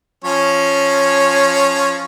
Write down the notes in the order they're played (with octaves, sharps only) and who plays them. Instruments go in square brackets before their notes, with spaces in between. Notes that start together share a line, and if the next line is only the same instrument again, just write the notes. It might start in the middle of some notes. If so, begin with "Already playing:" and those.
[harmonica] F3 C#4 C#5